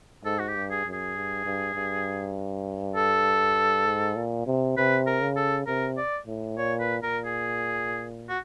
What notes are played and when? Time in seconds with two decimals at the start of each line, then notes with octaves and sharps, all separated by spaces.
0.25 G#2 A4
0.39 F#4
0.48 G4
0.56 G2
0.71 G#4
0.86 F#2
0.93 G#4
1.16 G2
1.45 G2
1.75 G2
2.96 A4
3.86 G#2
4.16 A#2
4.47 C3
4.77 C3 B4
5.07 A#4
5.21 C#3
5.37 A4
5.67 C3 A#4
5.97 D5
6.27 A2
6.57 A#2 C#5
6.80 B4
7.03 A#2 A#4
7.26 G#4
8.29 F#4